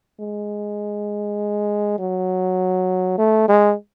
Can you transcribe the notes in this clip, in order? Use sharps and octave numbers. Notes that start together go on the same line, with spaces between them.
G#3
F#3
A3
G#3